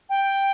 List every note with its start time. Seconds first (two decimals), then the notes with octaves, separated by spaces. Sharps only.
0.09 G5